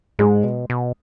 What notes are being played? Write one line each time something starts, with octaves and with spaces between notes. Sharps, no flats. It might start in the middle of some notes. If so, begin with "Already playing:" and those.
G#2 G#3
B2
B2